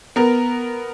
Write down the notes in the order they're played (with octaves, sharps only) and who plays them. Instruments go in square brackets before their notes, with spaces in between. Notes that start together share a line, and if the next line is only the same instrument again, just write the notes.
[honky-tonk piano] B3 A#4